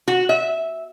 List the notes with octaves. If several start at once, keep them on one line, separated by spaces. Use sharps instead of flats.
F#4
E5